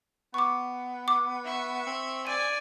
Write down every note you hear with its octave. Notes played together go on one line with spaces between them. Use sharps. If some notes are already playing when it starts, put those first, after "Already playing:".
B3 C#6 D6
D6
E5 C#6
C4
D5 G#5 D#7